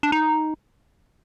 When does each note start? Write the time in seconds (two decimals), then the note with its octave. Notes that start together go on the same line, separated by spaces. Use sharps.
0.03 D4
0.12 D#4